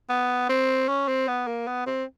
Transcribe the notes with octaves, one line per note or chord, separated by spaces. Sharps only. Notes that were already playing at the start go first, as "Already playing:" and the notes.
B3
C4
C#4
C4
B3
A#3
B3
C4